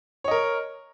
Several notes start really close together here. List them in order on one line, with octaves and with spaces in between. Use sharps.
C#5 D#5 A#4